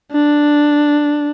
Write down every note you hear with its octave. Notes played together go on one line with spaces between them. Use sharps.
D4